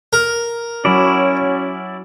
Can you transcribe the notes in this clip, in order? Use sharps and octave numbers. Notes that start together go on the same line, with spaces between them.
A#4
F#3 C#4 E4 F#4 D5